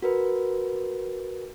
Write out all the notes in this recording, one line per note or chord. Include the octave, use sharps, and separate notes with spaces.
F#4 A#4 B4